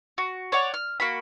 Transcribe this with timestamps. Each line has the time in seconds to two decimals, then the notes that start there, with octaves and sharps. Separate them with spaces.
0.18 F#4
0.52 C#5 D5 F#5
0.74 F6
1.00 A#3 F#4 B5